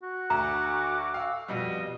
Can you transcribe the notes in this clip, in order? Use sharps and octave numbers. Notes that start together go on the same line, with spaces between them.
F#4
D2 A#5 D6
F5 E6
F2 B2 G3 D#5